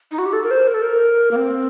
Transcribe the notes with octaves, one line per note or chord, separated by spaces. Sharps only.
D#4
F#4
G4
A4
A#4
C5
A#4
A4
A#4
A#3
C4